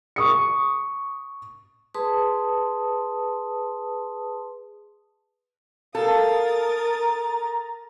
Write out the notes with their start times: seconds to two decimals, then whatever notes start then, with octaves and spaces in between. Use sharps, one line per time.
0.16 C#6 D#6 C#7
1.94 G#4 B4 A5 C6 D#6
5.95 A4 A#4 F5 D#6 A6
6.61 A#5